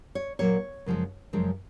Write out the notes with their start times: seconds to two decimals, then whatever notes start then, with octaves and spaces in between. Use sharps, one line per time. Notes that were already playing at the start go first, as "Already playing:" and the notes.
0.15 C#5
0.39 A#2 F#3 A#3 C#5
0.86 F#2 C#3 F3 G#3
1.33 F#2 C#3 F3 G#3